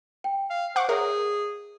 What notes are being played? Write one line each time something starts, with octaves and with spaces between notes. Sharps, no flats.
G5
F5
C5 F#5 C#6 D6
G#4 A#4 C#5 E5